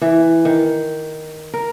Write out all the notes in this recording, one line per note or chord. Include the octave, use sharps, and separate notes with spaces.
E3
D#3
A#4